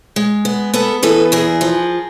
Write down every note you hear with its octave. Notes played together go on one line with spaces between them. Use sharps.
G#3
B3
B3 A4 B4
E3 A4 B4
E2 G#4 A#4
F3